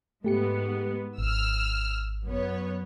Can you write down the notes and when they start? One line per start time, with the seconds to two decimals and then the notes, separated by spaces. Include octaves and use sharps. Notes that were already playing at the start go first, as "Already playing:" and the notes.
0.24 G#2 A3 B3 G4 C#7
1.18 G#1 E6 F6
2.26 F#2 B3 C#5